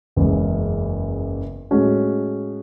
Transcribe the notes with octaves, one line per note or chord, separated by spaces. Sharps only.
F#1 E2 C#3 G#3
A2 G#3 C#4 F#4